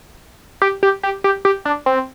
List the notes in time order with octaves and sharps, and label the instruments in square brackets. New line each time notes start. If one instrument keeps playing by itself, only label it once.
[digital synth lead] G4
G4
G4
G4
G4
D4
C4